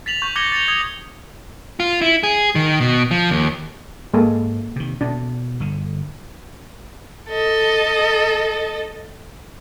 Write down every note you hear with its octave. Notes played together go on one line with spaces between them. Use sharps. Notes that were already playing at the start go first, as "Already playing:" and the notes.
A6 B6 F7 F#7
C#6 G6
D6 G6 G#6 A#6 C#7 G7
A6 A#6 C#7 F7
D#6 G#6 F7
F4
E4
G#4
D#3
B2
F3
D#2
G#2 G#3 A#3 A4
C3 D#3
B2 D4
G1 D3
A4 D#5